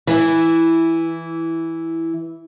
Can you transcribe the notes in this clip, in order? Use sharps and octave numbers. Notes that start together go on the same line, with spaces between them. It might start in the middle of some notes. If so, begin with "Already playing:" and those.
E3 E4